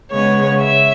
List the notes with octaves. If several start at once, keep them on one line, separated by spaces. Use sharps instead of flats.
C#3 G#3 B3 C#5
E5